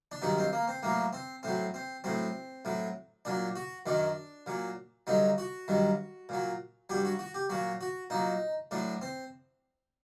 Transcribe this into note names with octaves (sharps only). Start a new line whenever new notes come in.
D4
G2 D#3 F#3 D#4
C4
A#3
C4
A2 F#3 A#3
C4
A2 F#3 C4
C4
A2 F#3 C4
A2 F#3
A#2 F#3 D4
F#4
F#2 D#3 F#3 D4
A#2 F#3
G2 D3 F#3 D#4
F#4
G2 D#3 F#3
A#2 F#3
G2 F#3 G4
F#4
F#4
G4
A#2 F#3 F#4
F#4
A#2 F#3 D#4
A2 F#3 D4
C4